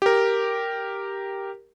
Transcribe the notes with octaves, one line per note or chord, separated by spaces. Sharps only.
G4 A#4